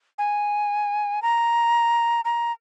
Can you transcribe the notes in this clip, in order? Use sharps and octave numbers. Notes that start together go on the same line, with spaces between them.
G#5
A#5
A#5